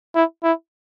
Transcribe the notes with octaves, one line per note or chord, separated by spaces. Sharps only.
E4
E4